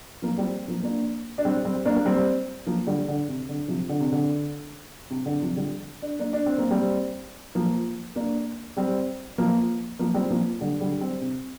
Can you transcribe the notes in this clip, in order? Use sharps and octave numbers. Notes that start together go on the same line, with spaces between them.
F3 A#3
G3 C4
F3 A#3
A#3 D4
D4
G3 C4
G3 C4
A#3 D4
A#3
G3 C4
F3 A#3
D3 G3
D3
C3
D3
C3 F3
D3
C3
D3
C3
D3
C3 F3
D3 G3
D4
A#3 D4
D4
C4
A#3
G3 C4
F3 A#3
A#3 D4
G3 C4
F3 A#3
F3 A#3
G3 C4
F3 A#3
D3 G3
D3 G3
G3 C4
C3